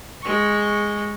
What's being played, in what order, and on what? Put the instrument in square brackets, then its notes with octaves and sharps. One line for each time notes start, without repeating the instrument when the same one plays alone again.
[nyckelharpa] G#3 C#6